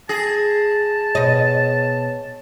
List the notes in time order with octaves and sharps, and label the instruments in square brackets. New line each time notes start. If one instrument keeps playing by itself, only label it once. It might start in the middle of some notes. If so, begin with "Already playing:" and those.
[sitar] G#4 [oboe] A5 [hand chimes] A#6
[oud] B2 D#5 [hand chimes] C#5